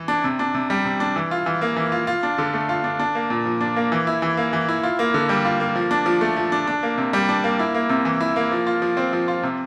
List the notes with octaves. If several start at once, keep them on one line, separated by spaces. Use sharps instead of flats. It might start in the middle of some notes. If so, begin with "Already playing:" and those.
Already playing: E3
D4
C3
D4
C3
G3
C3
D4
E3
F4
E3
A#3
E3
F4
F4
D4
D3
A3
F4
D4
D4
A#3
A#2
F3
D4
A#3
E3
E4
E3
A#3
E3
E4
F4
A#3
D3
G3
F4
A#3
F3
D4
F3
A3
F3
D4
D4
A#3
C3
G3
D4
A#3
E4
A#3
C3
E3
E4
A#3
F3
F4
F3
C4
F3
F4
C3